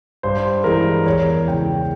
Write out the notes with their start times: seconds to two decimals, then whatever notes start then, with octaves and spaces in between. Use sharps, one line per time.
0.23 G2 C5
0.64 E3 G#3 A#4
1.06 E2 C#5
1.47 C#3 E3 G#3 G5